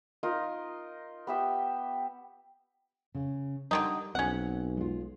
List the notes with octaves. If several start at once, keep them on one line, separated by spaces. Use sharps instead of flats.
D#4 F4 A#4 D#5
B3 G4 E5 G5
C#3
D3 D#3 G3 D#4
B1 C4 C#4 F#5
G#3 F4